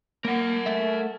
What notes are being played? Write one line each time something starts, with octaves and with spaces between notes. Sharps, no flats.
A#3 A#4 F#5
A3 E5